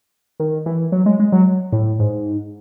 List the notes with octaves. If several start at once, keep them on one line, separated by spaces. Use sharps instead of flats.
D#3
E3
F#3
G#3
G#3
F#3
A2
G#2